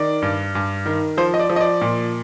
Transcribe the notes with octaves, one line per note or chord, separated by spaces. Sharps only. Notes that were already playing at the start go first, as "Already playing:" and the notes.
Already playing: D#3 D5
G2
G2
D#3
F3 C5
D#5
D5
F3
D#5
D5
A#2